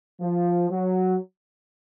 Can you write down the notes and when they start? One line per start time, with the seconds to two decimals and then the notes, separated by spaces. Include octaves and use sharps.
0.20 F3
0.70 F#3